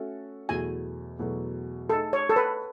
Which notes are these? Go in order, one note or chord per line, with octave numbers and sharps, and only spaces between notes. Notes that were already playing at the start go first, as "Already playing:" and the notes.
Already playing: A3 C#4 F#4 A4 E5
E2 B2 F#3 A3 G#5
E2 B2 F#3 A3
A3 D#4 G#4 A4
C#5
A4
B4